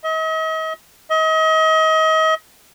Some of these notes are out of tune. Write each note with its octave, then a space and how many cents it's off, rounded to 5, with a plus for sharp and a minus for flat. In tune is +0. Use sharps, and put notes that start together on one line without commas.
D#5 +40
D#5 +35